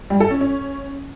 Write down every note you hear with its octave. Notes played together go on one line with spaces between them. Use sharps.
G3
A4
C#4
C#4